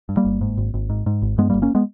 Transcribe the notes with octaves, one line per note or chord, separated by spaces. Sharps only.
G2
G3 A#3
G1
G#2
G#1
G#1
G#2
G#2
G#1
G2 G#3 B3
G3 A#3
G1
A#3 C#4
G#3 B3